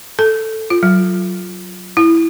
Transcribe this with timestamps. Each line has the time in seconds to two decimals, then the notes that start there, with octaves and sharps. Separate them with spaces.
0.19 A4
0.70 F4
0.83 F#3
1.97 E4